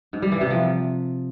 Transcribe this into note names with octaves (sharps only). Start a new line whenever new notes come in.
G#2
G3
E3
C3
F3